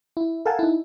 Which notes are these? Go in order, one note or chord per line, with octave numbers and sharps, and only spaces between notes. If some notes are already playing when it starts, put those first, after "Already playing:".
E4
A4 A#4 F5 F#5 G#5 A5
D#4 E4